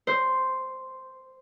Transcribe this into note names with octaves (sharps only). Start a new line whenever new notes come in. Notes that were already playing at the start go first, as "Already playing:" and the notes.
C5